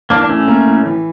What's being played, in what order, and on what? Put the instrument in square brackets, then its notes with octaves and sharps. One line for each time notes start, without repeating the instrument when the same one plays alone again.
[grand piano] E3 [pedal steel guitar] A#3 D4
[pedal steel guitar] D4
[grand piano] A2 [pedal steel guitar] A3 C#4
[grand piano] A#3
A2
E3